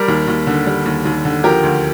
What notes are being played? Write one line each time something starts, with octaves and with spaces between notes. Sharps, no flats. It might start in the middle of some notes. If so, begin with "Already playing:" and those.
Already playing: G3 A#4 D5
D#2
D#2
D3
G3
D#2
D#2
D3
F3 G4 A#4
D2